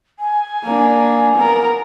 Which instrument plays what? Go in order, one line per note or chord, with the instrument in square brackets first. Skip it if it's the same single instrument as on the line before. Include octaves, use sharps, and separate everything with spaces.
[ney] G#5
[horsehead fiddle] A#3 D4
B3 A#4